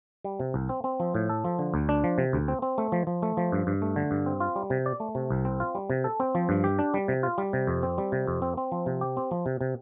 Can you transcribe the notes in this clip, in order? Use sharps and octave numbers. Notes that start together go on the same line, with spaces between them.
G3
C3
C2
C4
C4
F3
A2
A4
F3
D3
D2
D4
F3
C3
D2
C4
C4
A3
F3
F3
A3
F3
G2
G2
A3
D3
G2
C4
F4
G3
C3
D5
A3
C3
C2
C4
F4
G3
C3
A4
C4
F3
G2
G4
D4
G3
C3
F4
G3
C3
F2
C4
G3
C3
F2
C4
C4
F3
C3
G4
C4
F3
C3
C3